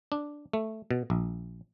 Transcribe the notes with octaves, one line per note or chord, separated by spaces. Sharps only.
D4
A3
B2
A#1